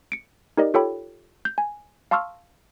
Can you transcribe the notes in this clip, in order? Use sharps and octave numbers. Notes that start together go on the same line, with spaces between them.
C#7 D7
D#4 G4 A#4 D5 D#5
F4 G4 A4 C#5 G5 B5
G6
G#5
F5 A5 C6 C#6 E6 F6